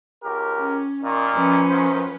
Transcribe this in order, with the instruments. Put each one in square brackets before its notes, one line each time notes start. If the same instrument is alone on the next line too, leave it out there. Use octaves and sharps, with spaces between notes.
[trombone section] C#2 G4 A#4
[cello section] C#4
[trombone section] A#2 D#3
[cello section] F3 C#4 B4
[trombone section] F#2 D#3 C5